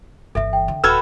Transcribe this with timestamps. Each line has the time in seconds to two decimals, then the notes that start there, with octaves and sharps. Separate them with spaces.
0.35 G1 E3 A4 E5
0.53 G5
0.68 D3
0.84 D#1 F#4 A4 B4 E6 F6 G#6